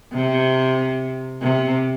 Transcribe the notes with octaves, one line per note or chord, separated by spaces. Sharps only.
C3
C3